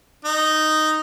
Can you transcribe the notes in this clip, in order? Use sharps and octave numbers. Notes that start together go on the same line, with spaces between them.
D#4